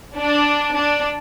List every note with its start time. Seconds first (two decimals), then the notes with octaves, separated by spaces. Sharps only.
0.18 D4
0.77 D4